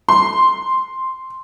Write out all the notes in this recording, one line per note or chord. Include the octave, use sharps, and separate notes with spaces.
C6